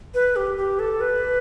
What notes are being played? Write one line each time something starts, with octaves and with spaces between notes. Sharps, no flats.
B4
G4
G4
A4
B4